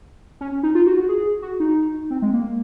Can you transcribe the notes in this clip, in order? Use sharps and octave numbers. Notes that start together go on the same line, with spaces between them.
C#4
C#4
D#4
F4
F#4
F#4
G#4
F#4
D#4
C4
G#3
A#3